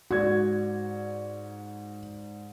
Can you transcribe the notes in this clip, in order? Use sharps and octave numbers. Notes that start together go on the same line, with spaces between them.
G#2 F#4 D5 G#6